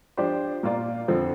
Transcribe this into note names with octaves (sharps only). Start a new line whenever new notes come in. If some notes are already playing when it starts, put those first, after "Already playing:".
F3 D4 G4 C5
A#2 A#3 F4 D5
F2 D3 F3 C4